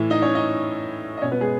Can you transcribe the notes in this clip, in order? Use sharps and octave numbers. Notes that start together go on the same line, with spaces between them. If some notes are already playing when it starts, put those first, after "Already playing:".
Already playing: A2 E3 E4 E5
D#4 D#5
C#4 C#5
D#4 D#5
D#5
B2 C#4 C#5
B3 B4
G#3 G#4